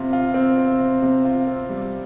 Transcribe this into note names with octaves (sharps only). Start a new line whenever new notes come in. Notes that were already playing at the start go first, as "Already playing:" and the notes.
Already playing: C3 F4
F4
C4
C4
C3
C3
F4
C4
G3